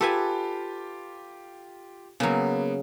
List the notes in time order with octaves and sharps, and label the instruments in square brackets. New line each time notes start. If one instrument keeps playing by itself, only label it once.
[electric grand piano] F4 G4 [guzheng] A4 B4 G#5
[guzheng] C#3 F#3 [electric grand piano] A#3 B3